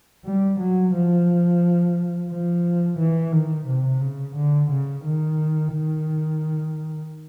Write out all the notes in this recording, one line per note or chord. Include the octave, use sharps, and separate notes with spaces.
G3
F#3
F3
F3
E3
D#3
C3
C#3
D3
C#3
D#3
D#3